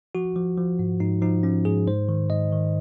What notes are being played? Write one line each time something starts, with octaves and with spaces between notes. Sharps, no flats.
F3 F#4
F3
F3
G#2
G#2 D#4
F3 D#4
F3 C#4
G#2 G#4
G#2 C5
D#3
G#2 D#5
D#3